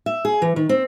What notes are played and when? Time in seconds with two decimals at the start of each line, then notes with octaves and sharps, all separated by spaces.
0.06 E5
0.25 G#4
0.42 E3
0.56 D#3
0.69 C4